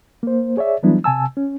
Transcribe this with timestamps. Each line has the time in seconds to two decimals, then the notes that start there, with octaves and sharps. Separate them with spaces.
0.23 A#3 C5
0.57 G#4 C#5 D5 E5
0.83 E3 F#3 G3 B3 D4 E4
1.04 C3 G#5 A5 E6
1.37 C#4